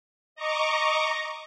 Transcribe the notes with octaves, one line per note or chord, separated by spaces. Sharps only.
D#5 A#5 C#6 D6